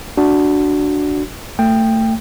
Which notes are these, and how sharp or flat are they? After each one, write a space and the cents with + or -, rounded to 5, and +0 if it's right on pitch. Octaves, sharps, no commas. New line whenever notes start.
D4 +0 F#4 +0
A3 +25 G5 +10